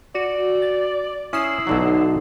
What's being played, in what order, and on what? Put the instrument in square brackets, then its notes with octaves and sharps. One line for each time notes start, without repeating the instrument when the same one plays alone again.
[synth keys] F#4 [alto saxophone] D5
[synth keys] A6
[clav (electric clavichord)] C#4 [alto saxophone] E4 [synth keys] D#6 C7 E7
[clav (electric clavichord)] B1 D3 F#3 [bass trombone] D#4